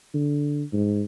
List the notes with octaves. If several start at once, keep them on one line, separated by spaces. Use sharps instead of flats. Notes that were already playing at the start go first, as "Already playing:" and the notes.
D3
G#2